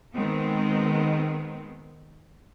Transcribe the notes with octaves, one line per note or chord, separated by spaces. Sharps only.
D#3 G#3 B3 C4